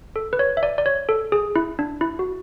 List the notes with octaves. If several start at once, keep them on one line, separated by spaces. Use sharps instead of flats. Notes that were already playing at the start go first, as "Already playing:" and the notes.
A4
B4
C#5
E5
D5
D5
C#5
A4
G#4
E4
D4
E4
F#4